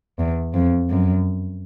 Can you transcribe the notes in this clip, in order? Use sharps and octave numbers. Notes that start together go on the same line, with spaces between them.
E2
F2
F#2